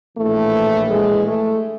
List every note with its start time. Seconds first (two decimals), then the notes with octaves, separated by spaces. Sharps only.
0.17 A#1 A2 E3 A3
0.90 G#3
1.27 A3